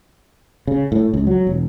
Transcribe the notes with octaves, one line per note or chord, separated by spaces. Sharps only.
C#3
A2
C#2
F#3
E1